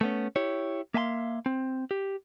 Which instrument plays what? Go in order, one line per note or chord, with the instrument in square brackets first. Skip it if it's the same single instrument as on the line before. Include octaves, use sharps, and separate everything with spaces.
[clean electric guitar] A3 B3 C#4
E4 G4 C#5
A#3 E5 F5 G#5 C6
C4
G4